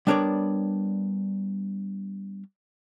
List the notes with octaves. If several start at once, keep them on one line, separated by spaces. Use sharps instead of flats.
G3 B3 D4 A#4 C#5 D5